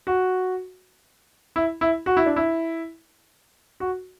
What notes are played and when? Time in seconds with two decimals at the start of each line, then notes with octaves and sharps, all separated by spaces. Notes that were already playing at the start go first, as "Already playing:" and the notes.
0.07 F#4
1.56 E4
1.81 E4
2.06 F#4
2.17 E4
2.26 D4
2.36 E4
3.80 F#4